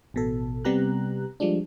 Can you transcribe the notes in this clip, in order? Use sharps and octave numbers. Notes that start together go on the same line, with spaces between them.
A1 B2 A4
C3 G3 B3 G4 A#5 F#6
F3 G3 G#3 D4